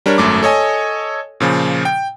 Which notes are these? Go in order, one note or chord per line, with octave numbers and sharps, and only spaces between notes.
G3 D4 A#4 C#5
G#1 F#2 A3 D6
A4 C#5 D#5 G#5
A#2 C#3 F3
G5